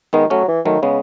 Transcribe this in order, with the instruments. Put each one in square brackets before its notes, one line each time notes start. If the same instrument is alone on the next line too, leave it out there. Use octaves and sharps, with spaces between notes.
[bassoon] D#3 [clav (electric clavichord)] G#3 B3
[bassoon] F#3 [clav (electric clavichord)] A3 C#4
[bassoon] E3
[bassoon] D#3 [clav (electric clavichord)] F#3 A3
[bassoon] C#3 [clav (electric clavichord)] G#3 B3